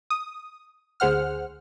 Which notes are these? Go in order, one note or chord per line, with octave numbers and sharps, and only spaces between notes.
D#6
D2 G#4 C5 F#5 F6